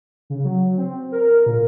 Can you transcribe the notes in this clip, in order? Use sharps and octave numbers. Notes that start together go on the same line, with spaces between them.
C#3
F#3
C4
A#4
A#2